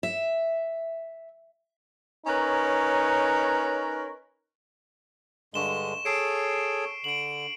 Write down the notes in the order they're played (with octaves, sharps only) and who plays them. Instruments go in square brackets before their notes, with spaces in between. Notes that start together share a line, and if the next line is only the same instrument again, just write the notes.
[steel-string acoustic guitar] E5
[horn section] C#4 D#4 A#4 B4 C#5
[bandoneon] G2 D3 G#3 [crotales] C#6 E7 G7
[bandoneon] G#4 A4 C#5 [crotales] C7 D7
[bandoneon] D3 [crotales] D7 F#7